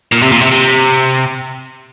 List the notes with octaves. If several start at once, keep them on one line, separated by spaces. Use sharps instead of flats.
A#2
C3
A#2
C3
C3